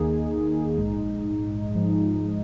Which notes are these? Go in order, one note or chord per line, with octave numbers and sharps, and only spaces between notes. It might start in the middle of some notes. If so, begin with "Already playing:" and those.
Already playing: D#2 D#3 A#3 D#4 G#4
A#1 G#2 G#3 D#4
G#2 F3 G#3 D#4